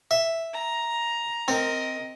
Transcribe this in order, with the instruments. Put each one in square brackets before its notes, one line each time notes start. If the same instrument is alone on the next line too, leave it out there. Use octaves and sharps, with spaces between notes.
[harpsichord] E5
[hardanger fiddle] A#5
[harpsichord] C4 [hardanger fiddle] A#4 D#5